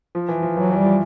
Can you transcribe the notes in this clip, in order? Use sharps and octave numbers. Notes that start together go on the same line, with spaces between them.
F3
E3
F3
E3 F#3
E3
G3
F3